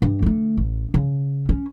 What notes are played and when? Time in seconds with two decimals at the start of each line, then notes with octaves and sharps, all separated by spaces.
0.02 G2
0.22 D3 A3
0.57 A1
0.94 C#3
1.49 C#4